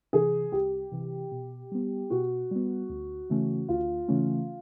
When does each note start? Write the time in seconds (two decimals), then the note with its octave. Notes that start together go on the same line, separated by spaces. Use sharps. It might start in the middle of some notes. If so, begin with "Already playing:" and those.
0.13 C3 E3 G#4
0.52 C2 G4
0.92 C3 E3
1.32 B2
1.72 G3 B3
2.10 B2 F#4
2.51 G3 B3
2.89 D2
3.30 C#3 E3 A3 C#4
3.69 D2 F4
4.08 C#3 E3 A3 C#4